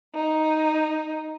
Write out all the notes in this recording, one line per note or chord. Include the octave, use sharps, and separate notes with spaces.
D#4